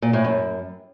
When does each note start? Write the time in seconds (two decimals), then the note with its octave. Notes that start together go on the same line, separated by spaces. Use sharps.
0.02 A#2
0.13 A2
0.24 F#2